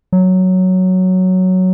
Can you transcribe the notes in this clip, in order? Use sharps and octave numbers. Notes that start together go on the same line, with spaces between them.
F#3